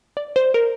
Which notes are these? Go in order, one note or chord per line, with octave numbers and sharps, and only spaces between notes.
D5
C5
A#4